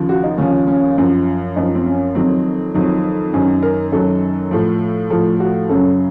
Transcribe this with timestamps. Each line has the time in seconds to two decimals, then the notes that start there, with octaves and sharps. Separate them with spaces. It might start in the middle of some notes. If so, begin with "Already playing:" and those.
Already playing: D#2 C#3 F3
0.09 F#4
0.24 D#4
0.38 D#2 C#3 F3 C#4
0.67 C#4
0.97 F#2 F3
1.56 F#2 F3 D#4
1.75 C4
1.86 C#4
2.15 F2 D#3 F#3 C4
2.74 F2 D#3 F#3
3.33 F#2 D#3 F#3 C#4
3.63 A#4
3.92 F#2 D#3 F#3 A4
4.51 A2 F3
5.10 A2 F3 A4
5.40 F#4
5.69 F#2 C#3 F#3 A4